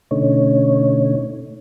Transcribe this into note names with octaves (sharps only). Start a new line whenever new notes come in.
B2 D3 A3 C#4 D#4 C#5